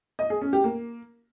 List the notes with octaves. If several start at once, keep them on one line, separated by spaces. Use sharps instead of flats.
D#5
G#4
C#4
G4
A#3